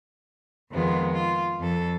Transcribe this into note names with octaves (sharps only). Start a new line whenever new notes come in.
F2 D#3 G#3 B3 F4
F4
F2 A4